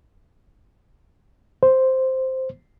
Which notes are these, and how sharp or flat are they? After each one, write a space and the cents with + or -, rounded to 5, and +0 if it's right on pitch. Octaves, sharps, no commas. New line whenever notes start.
C5 +0